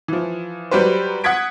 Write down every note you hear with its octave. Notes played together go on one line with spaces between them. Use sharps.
E3 F3
F#3 G3 F#4 G4 B4 C5
F#5 D#6 G#6 B6 D7